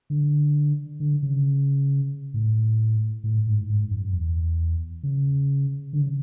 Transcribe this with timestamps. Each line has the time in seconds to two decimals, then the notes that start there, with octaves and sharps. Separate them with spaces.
0.10 D3
1.00 D3
1.23 C#3
2.34 A2
3.24 A2
3.47 G#2
3.70 G#2
3.91 F#2
4.13 E2
5.03 C#3
5.93 D3
6.01 C#3